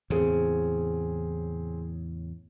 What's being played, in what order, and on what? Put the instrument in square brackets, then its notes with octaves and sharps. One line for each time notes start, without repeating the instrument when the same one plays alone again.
[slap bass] E2 A2 C#3 [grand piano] C4 G#4